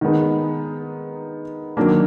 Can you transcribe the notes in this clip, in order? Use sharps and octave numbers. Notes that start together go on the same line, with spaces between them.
D#3 G#3 B3 D#4
D#3 F#3 A#3 D4